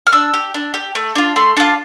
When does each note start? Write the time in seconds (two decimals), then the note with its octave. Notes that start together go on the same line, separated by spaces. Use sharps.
0.07 F6
0.12 D4 E6
0.34 G4
0.54 D4
0.74 G4
0.95 A3
1.15 D4 F4
1.36 A3 C6
1.57 D4 F4 A5